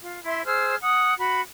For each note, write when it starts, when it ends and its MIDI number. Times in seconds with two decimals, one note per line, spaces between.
0.01 0.19 65
0.26 0.45 64
0.26 0.45 76
0.26 0.45 84
0.46 0.76 68
0.46 0.76 72
0.46 0.76 88
0.46 0.76 89
0.82 1.14 78
0.82 1.14 87
1.19 1.40 66
1.19 1.40 83